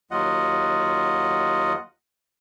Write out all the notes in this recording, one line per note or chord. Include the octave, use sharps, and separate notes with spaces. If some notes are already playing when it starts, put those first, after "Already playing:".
D#2 F#3 F4 D#5 F#5